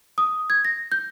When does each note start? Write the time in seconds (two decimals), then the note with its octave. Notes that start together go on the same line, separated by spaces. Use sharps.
0.18 D#6
0.50 G#6
0.65 A#6
0.92 G6